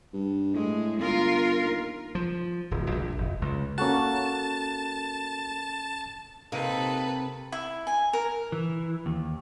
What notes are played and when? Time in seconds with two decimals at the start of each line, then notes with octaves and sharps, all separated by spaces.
0.13 G2
0.54 A2 G#3
1.00 G1 F4 A#4
1.63 D#2
2.15 F3
2.71 D1
2.91 A#1
3.17 F1
3.42 C#2
3.78 A#3 C#4 F#4 A4 A5 F#6
6.52 C3 A#3 D#4 A4 B4
7.52 E4
7.87 G#5
8.13 A#4
8.52 E3
9.06 D#2